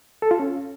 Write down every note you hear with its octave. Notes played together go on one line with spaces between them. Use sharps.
A4
F4
C#4